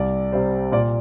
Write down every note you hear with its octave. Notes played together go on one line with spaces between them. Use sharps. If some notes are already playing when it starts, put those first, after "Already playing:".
Already playing: C2 D5
C3 G3 C5
A#2 D5